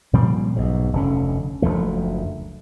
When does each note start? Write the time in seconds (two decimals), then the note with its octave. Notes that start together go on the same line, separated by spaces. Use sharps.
0.13 A#2 F3 G3 C4
0.56 B1 G#2
0.93 F1 D2 D3 C#4
1.62 F#1 D2 F3 A3